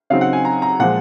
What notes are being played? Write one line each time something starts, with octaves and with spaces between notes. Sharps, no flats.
C#3 F#3 C4 D#4 F5
F#5
G#5
A#5
A#5
A#2 F3 G#3 F#5